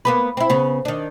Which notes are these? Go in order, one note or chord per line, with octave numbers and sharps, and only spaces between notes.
A#3 B3 B4
C4 E4
C#3 B3
D#3 D4